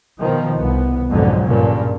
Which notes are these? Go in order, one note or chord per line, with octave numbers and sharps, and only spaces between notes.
B2 D#3 F3
C2 B3
F2 G#2 B2 D3 F#3
G2 A#2 C#3